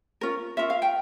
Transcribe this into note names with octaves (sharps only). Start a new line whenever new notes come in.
C#4 F4 A#4
C#4 F4 A#4 E5
F5
G5